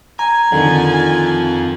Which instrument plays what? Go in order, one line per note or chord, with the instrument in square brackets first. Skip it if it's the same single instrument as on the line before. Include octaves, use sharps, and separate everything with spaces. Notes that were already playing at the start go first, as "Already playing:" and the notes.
[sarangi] G#5 [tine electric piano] A#5
[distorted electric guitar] F2 F3 [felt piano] D3 D#3